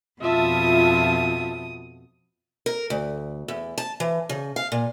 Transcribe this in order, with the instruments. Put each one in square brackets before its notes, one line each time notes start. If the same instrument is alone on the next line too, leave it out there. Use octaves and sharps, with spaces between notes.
[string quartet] F2 B2 D#6 [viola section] F4 E5 A5
[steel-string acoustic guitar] A#4
D2
E2
A5
E3
C#3
F5
A#2